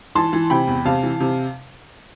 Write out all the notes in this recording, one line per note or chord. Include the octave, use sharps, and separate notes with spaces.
E3 A5 C6
E3
C3 G5 B5
E2
C3 F5 A5
E3
C3